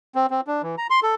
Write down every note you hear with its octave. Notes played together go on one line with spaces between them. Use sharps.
C4
C4
D4
E3
A#5
C6
A4